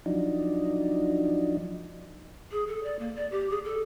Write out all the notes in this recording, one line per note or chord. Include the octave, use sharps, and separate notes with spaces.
F3 F#3 D4 D#4
G#4
A4
D5
A#3
D5
G4
G#4
A4